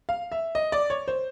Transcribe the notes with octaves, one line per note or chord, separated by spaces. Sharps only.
F5
E5
D#5
D5
C#5
C5